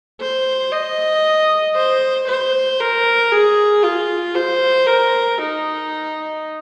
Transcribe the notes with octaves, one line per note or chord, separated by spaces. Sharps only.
C5
D#5
C5
C5
A#4
G#4
F4
C5
A#4
D#4